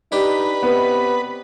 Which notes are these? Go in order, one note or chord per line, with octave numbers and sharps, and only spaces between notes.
D4 D#4 G4 B4
C3 B3